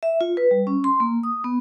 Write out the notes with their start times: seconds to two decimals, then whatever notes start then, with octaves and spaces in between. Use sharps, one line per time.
0.03 E5
0.21 F4
0.37 B4
0.51 G3
0.67 C#4
0.84 C6
1.00 A#3
1.23 D#6
1.44 B3